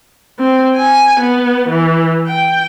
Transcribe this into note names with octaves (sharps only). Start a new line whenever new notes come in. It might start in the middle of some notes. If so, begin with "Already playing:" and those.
C4
G#5
B3
E3
G5